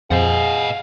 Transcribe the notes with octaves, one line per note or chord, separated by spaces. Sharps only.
F2 F3 G#4 D#5 F5 F#5